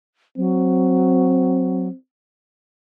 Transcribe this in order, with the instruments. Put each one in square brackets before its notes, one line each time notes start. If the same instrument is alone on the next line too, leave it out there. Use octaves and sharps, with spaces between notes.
[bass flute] F#3 [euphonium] C4